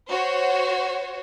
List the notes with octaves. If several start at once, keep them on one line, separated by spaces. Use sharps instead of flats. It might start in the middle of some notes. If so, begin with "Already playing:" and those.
F#4 C5 C#5